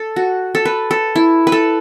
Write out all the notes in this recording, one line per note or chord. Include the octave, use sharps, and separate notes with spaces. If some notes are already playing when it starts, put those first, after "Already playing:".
Already playing: A4
F#4
A4
B4
A4
E4
B4
A4